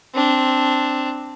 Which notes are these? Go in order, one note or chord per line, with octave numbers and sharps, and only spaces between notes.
C4 D4